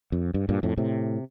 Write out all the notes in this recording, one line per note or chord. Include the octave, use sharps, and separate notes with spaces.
F2
G2
G2 A#2
F2 A2
A2 C3